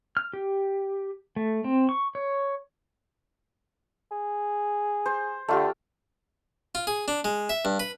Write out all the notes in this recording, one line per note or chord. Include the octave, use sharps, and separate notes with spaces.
F6
G4
A3
C4
C#6
C#5
G#4
C5
D3 A3 F4 G4
F4
G#4
D4
G#3
E5
G2
B4